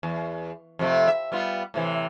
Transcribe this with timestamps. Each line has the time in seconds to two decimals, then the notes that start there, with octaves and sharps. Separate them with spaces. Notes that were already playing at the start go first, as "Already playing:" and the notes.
0.03 E2
0.79 F2 C3 A3
1.07 E5
1.32 G3 B3 F4
1.74 A2 C3 E3